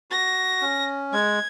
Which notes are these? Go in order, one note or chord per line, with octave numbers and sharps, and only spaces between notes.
F#4 A#6
C#4
G#3 G#6